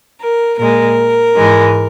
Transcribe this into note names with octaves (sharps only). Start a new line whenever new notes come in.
A#4
A#2 G#3 A#4
G#2 E3 G#3